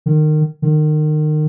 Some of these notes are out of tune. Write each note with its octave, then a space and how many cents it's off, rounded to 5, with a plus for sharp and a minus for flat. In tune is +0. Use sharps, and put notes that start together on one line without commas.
D#3 -25
D#3 -30